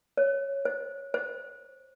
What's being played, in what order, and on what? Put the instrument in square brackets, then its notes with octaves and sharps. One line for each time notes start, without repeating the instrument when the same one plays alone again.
[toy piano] C#5
C5
C5